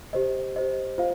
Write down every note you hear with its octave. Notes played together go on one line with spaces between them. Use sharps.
G4 C5 D#5
G4 C5 D#5
F4 C5 F5